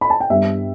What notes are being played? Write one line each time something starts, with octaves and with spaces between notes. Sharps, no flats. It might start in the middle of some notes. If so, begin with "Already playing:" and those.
B5
A5
G5
G2 G3 B3 E5